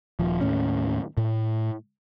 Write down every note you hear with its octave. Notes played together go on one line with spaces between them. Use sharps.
D#1 F3
D#2 A2 C#4
A2